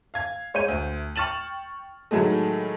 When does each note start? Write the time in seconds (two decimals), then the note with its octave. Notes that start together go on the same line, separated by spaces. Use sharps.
0.14 F5 G#6
0.54 G#3 C#5 G6 D#7
0.68 D2
1.16 G5 C#6 F6 A6 E7 F#7
2.11 A2 D#3 F#3 G#3 A3